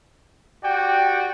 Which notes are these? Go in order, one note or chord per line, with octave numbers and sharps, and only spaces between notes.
F#4 G4 D5 G5